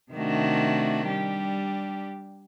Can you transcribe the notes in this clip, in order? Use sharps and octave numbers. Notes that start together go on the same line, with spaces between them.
C3 D#3 A3 D4 F#4
G3 D4 G4